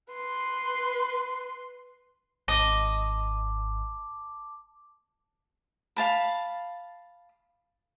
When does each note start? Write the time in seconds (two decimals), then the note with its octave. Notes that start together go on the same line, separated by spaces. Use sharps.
0.12 B4 C6
2.48 G#1 D#5 A5 D6
5.96 F5 A5 B5